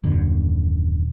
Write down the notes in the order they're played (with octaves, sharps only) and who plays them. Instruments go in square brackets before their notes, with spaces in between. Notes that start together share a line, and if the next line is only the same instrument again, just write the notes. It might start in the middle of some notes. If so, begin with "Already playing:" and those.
[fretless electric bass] D#1 F#2 D3